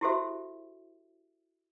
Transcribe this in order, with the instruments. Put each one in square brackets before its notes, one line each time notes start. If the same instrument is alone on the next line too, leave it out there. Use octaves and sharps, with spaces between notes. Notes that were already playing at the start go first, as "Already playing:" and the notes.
[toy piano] E4 F#4 G4 A4 C5 E5